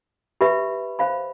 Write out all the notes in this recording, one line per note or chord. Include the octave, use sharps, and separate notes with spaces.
G4 B4 E5 B5
C5 F5 B5